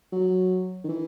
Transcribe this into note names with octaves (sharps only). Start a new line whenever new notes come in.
F#3
D#3
E3